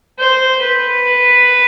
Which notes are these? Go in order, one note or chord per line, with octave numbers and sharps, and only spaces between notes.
C5
B4